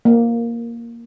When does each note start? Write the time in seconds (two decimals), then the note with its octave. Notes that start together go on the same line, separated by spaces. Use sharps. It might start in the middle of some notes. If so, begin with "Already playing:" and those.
0.05 A#3